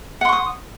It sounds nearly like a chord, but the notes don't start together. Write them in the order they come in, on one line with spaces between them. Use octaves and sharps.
F#5 C6 C#6 D#6